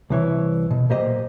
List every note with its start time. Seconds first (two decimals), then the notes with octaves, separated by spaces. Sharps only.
0.10 C2 E3 C#5
0.71 B2
0.89 B1 A#2 A#3 G4 C5 D#5